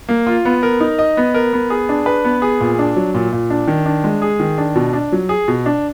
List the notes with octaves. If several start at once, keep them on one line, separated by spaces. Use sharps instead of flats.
A#3
F4
B3
A#4
D#4
D#5
B3
A#4
B3
G#4
D4
B4
B3
G#4
A#2
D4
F#3
A#2
A#2
D4
D#3
D4
G#3
G#4
D#3
D4
B2
D4
F#3
G#4
B2
D4